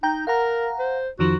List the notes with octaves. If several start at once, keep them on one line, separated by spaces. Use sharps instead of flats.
D#4 G5 A#5 G6
A#4 F5 F#5 A#5
C5
F2 D#3 F3 F#4